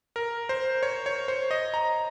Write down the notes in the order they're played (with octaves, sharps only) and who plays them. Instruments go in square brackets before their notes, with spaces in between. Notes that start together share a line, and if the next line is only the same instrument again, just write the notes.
[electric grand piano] A#4
C5
C#5
C#5
C5
D#5
A#5